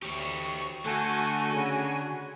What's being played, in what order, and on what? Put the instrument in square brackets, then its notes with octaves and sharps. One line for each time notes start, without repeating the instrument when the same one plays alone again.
[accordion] D2 C#6 [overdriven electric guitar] G4 C#5
[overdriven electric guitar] D3 [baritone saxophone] A3 [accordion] F#4 G#5
[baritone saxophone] C#3